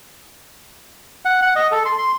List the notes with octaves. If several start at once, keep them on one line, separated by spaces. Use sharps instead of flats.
F#5
F#5
D#5
A4
C6
C6